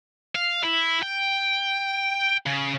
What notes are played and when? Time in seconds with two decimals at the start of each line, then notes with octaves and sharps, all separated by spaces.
0.35 F5
0.64 E4
1.03 G5
2.46 C#3